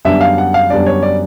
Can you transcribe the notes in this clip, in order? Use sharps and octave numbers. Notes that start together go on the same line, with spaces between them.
F#2 D3 G3 B3 D4 E5
F5
F#5
F5
F#2 D3 G3 B3 D4 D5
C#5
D5